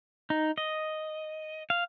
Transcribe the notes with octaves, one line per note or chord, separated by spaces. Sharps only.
D#4
D#5
F5